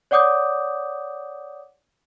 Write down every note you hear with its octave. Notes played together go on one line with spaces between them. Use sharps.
C#5 D5 F#5 D6 D#6 G6